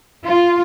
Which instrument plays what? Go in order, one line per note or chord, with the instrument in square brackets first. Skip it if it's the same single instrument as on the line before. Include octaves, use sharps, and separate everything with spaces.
[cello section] F4